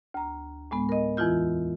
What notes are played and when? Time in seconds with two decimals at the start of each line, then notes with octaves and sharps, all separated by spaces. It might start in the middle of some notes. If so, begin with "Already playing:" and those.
0.14 D2 A#5
0.71 A2 G#3 B3
0.89 A#4 D#5
1.17 E2 E3 E4 F4 G6